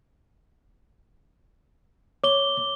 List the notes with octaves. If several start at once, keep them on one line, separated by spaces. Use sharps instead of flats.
C#5 D6 G7